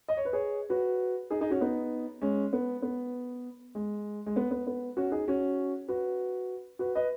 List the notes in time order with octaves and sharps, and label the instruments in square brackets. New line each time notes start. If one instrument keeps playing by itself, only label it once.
[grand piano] D#5
C#5
B4
G#4 C#5
F#4 B4
D#4 G#4
D#4 G#4
C#4 F#4
B3 D#4
G#3 C#4
B3
B3
G#3
G#3
B3
B3
B3
C#4 F#4
D#4 G#4
C#4 F#4
F#4 B4
F#4 B4
B4 D#5